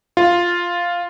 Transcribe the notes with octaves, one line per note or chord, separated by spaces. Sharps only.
F4